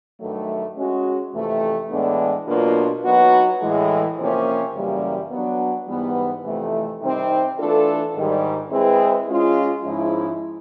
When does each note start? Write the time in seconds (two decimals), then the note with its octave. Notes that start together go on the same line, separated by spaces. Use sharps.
0.20 G2 D#3 F#3 A3
0.77 G#3 C#4 F#4
1.34 F2 C3 E3 A3
1.90 A2 E3 G#3 B3 D4
2.47 B2 F#3 A#3 D4 F4
3.03 F#3 B3 D#4 F#4 B4
3.61 A2 E3 G#3
4.18 C3 F3 A#3 C#4
4.74 F#2 C#3 E3 G3 A#3
5.31 F#3 B3 D4
5.87 G#2 E3 G3 B3
6.44 F2 C3 E3 A3
7.01 C3 D#3 G3 C4 D#4
7.58 E3 A3 D4 F4 A4
8.15 G#2 D#3 G3
8.71 G#3 C4 E4 G#4 B4
9.28 G#3 C#4 F4
9.84 G#2 F3 G#3 C#4 E4